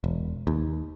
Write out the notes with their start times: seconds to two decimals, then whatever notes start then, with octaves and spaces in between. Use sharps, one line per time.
0.04 E1
0.47 D#2